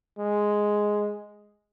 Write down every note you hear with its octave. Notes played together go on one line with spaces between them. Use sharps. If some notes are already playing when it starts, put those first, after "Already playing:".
G#3